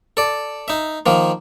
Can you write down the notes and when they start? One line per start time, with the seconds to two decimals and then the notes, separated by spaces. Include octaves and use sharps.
0.17 A4 D5
0.68 D#4 E5
1.06 D#3 F3 A#3